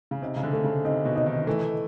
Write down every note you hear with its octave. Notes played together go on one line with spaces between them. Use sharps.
C#3
C3 D#4
C#3
D3
A3
C#3
C3 D#4
B2
D#4
D#3
E3 A3